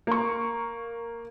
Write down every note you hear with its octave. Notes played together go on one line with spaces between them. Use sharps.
A#3 C#6